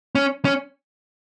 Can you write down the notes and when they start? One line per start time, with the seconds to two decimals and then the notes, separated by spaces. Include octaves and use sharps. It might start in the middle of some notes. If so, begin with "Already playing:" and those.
0.15 C#4
0.45 C#4